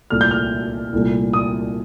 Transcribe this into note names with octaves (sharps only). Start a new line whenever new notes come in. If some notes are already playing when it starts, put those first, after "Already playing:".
C2 A#2 A3 F6
G6
F6
C2 A#2 A3
D#6